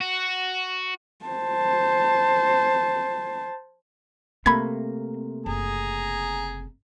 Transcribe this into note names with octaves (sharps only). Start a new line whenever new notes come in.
F#4
C5 A5
C3 A3 A#3 C4 B5 G#6
F#1 G#4 A#5